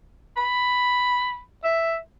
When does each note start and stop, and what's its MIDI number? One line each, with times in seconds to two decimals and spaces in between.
0.37 1.38 83
1.64 1.97 76